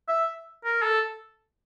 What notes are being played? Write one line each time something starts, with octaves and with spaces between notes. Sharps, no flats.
E5
A#4
A4